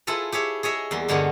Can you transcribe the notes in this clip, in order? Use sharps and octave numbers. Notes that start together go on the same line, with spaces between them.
E4 F4 G#4 A4 B4
G4 G#4 C#5 E5
G#4 C#5 D#5 E5
E2 G3 A#3 C6
G2 D3 G#3 A#3 B3 C#4